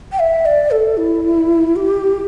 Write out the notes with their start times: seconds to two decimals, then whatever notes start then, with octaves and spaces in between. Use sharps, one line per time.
0.12 G5
0.19 E5
0.45 D5
0.71 A4
0.97 E4
1.76 G4